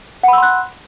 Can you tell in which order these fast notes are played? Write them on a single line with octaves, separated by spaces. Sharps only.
F#5 B5 E6 C6 F#6